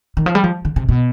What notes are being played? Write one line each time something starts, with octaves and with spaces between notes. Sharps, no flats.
D#3
F3
G3
F3
D3
C3
B2